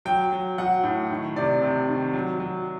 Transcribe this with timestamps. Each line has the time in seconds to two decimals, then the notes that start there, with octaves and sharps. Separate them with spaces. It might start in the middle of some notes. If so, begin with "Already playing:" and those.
0.05 F#3 G5
0.32 F#3
0.58 F#3 F#5
0.83 A2
1.10 D#3
1.36 C3 D5
1.62 C3
1.88 D#3
2.14 F#3
2.40 F#3